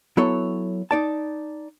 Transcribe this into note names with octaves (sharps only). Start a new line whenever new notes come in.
F#3 B3 E4 A4 C#5
D#4 D5 A5